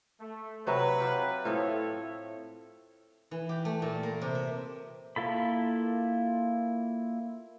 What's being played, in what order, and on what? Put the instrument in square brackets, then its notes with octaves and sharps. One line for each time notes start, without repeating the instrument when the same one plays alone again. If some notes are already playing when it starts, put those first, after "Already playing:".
[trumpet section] A3
[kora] C3 F#3 C#5 [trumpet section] B4
[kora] F#3 F4 G4
[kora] A2 C4 F4 [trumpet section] A4 C#5 E5
[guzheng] E3
G4
A3
A#2
A#3
C3
E5
[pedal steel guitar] A#3 E4 F4 A4 B5